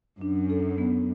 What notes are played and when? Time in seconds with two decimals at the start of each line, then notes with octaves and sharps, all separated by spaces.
0.21 F#2 D4
0.50 A4
0.78 B3